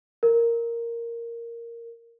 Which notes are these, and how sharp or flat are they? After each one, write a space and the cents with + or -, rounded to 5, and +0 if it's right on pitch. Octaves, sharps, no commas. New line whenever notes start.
A#4 -5